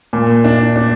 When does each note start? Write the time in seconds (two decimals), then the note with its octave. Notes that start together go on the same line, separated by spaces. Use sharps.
0.13 A#2
0.45 D4
0.76 D4